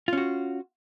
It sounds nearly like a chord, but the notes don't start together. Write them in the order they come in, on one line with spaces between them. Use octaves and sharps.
F4 C#4 F#4